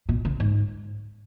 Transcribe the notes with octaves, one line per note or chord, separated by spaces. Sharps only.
B2
C#3
G#2